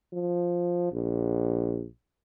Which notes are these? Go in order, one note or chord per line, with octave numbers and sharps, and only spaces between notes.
F3
A#1